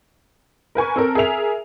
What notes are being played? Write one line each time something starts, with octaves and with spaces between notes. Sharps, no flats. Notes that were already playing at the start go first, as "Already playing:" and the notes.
A#4 B4 G#5 C#6
C4 A4 A#4
G#4 A#4 E5 F7